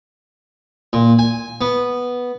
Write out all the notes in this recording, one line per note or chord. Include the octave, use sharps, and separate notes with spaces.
A#2
G#5
B3